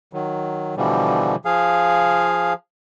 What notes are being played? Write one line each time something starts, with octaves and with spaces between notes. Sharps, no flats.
D#3 F#3
B2 D3 E3 F3 G3
F3 G#4 F5